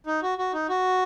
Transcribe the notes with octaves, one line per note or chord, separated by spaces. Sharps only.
D#4
F#4
F#4
D#4
F#4